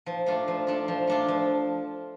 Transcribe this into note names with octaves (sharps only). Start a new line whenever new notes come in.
F3
A3 D4 F4
F3
A3 D4 F4
F3
A3 D4 F4
F3